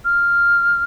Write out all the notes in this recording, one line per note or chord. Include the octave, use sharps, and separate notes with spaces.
F6